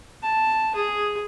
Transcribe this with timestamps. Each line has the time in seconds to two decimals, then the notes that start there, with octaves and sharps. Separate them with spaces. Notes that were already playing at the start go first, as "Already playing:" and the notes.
0.22 A5
0.75 G#4